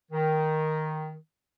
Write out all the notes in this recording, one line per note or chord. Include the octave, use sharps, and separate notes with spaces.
D#3